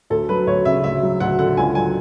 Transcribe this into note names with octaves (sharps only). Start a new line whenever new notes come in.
D2 A4
F#3 B4
D2 C#5
C#3 E5
D2 E5
F#3
D2 F#5
D3 F#5
C#2 G#5
F#3 G#5